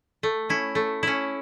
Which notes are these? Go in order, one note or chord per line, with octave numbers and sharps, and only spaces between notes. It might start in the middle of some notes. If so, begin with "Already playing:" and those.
A3
C#4 E4
A3
C#4 E4